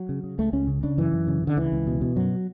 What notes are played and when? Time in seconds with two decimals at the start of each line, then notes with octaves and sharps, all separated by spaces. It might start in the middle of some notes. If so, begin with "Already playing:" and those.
Already playing: F#3
0.09 C#3
0.24 C#3
0.38 C#2 A3
0.53 C#2 C#4
0.68 C#3
0.83 C#3 D4
0.98 F#2 E3
1.13 F#2
1.28 C#3
1.42 C#3
1.47 D3
1.57 C#2 E3
1.72 C#2
1.87 B2
2.01 B2
2.16 F#2 F#3